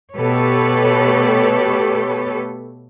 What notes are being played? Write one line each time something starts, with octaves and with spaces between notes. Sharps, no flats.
B2 A3 G4 A4 B4 C#5